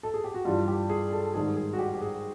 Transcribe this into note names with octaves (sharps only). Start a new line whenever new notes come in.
A4
G#4
G4
F#4
G2 E3 G3 F4
G4
G#4
A4
G#2 D#3 G3 G#4
G#4
F#4
G4
G4
G#4